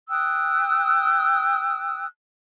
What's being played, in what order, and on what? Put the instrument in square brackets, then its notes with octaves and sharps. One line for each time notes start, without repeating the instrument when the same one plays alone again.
[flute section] G5 D#6 E6 F#6